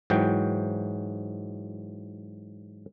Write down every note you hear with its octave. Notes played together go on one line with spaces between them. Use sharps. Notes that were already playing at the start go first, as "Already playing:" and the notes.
G#2 E3 F#3 G5